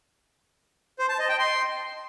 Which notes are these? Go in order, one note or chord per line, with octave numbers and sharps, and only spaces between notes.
C5
A5
D#5
G5
C6